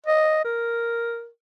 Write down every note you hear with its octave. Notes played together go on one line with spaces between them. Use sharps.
D#5
A#4